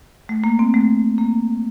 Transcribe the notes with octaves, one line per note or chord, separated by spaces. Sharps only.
A3
A#3
C4
A3
A#3